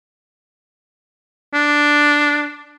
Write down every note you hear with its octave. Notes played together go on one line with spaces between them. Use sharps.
D4